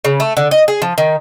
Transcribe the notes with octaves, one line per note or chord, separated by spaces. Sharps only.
C#3
A3
D3
D#5
G#4
F3
D#3